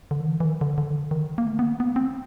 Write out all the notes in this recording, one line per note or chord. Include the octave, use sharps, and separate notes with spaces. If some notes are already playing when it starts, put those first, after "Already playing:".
D3
D#3
E3
E3
D#3
D3
D3
D#3
A#3
A3
B3
A#3
B3
C4